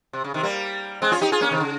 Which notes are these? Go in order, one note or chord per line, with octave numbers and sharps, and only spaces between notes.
C3
C#3
C3 D#3
G3 A#3
G#3 C4
C#4 F4
D#4 G4
F4 G#4
A#3 C#4
C3 D#3
C#3